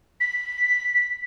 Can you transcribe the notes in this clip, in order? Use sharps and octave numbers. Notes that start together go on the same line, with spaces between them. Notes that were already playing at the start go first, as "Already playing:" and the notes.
B6